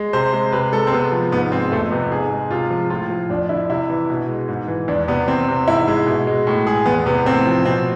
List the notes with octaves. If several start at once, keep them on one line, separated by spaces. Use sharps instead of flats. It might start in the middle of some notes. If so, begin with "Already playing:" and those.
Already playing: G#3
C3 C5
G#3
C3 B4
G#3 A4
C4
C3 B3
F3
G#2 B3
G#3 C4
F2 A3
C3 B3
G#2 G#4
G#3
C3 F4
F3
A2 F4
F3
F2 D4
D3 E4
C3 E4
E3
B2
G#3
G#2
E3
E2 D4
C3 B3
E2 C4
C3
G#2 E4
G#3
B2
G#3
A2
G#3 G#4
E2 B3
C3 B3
A2 C4
F3
B2 C4